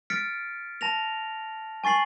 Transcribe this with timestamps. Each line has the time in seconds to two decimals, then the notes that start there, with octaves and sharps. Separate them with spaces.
0.10 F6 A6 B6 C#7 D7
0.81 A5 A#6 F7
1.84 G#5 C#6 A6 C7 F#7